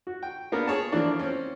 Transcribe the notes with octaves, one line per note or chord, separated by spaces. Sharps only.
F#4
G5
A#3 B3 D4 A#4
G#4 C#5 A5
E3 F3 A#3 D4 F4 D5
C4 C#4